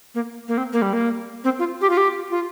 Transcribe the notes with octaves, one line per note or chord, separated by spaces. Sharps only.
A#3
A#3
C4
A#3
G3
A#3
C4
F4
G4
F4
G4
F4